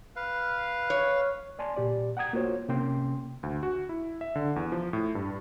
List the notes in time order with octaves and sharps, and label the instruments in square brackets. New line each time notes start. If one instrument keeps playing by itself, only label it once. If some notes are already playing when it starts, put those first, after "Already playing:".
[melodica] B4 F5
[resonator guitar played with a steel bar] C#5
[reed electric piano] D5 G#5 A5 C6
A#2 G4 D5
F#5 G5 A#5 D#6 G#6
A#3 F4 F#4 C5 C#5
C3 A#3 C#4 G5 C6
[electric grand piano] D2
F#4
E4
E5
D3
E2
F3
A2
G2